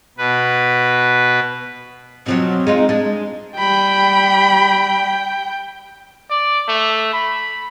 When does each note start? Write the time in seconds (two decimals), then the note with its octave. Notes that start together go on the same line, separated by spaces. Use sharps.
0.18 B2 B4
2.26 B2 F3 F#3 C4
2.67 G#3 D#4 F4
2.89 G#3 D4
3.58 G3 G5 B5
6.30 D5
6.68 A3
7.13 B5